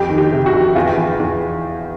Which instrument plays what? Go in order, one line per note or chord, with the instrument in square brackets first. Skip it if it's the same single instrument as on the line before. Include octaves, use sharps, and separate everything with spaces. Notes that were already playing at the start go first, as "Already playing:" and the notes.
Already playing: [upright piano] F2 G4
D#3
G4
C3
F#4
F2
E2 F4
E2
E2